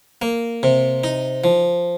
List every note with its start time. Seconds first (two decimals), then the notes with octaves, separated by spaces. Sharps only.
0.22 A#3
0.63 C3
1.04 D#4
1.44 F3